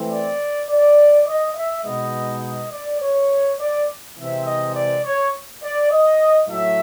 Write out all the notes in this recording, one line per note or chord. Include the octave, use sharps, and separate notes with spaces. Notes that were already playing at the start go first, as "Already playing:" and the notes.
Already playing: E3 A3 C4
D5
D5
D#5
E5
B2 G#3 B3 D#4 D#5
D#5
D5
C#5
D5
C3 E3 G#3 C4 E5
D#5
D5
C#5
D5
D#5
A2 F#3 A3 E5